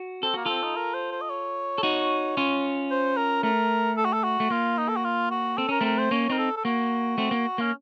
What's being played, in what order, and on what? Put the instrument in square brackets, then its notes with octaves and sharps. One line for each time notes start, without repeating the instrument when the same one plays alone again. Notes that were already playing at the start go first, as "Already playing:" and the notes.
Already playing: [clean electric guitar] F#4
[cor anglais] C4 [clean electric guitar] A4
[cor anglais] A#3 [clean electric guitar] F#4
[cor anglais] C4 [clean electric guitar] F4 A4
[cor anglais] D#4
A#4
C5
C5
D#5
C#5
[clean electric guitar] A4
D#4 F#4
C#4 F4
[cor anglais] C5
A#4
[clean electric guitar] A3 [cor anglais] A#4
[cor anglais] A4
F#4
A4
F#4
[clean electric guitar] A3
[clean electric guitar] A#3 [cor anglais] F4
[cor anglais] D#4
A4
F#4
F4
F#4
[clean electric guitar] C4 [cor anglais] A4
[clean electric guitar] C#4 [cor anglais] A#4
[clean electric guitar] A3 C4 [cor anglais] A#4
[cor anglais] C5
[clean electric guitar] A#3 C#4 [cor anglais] C#5
[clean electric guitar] C4 D#4 [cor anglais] A#4
[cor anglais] A4
A4
[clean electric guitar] A#3 [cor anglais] F#4
[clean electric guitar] A3 C4
A#3
[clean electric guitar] A#3 [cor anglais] C#4